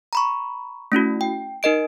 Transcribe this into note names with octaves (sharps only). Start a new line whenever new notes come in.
A#5 B5 C#6
A3 C#4 E4 F#4
G5
D#4 A#4 D#5 D7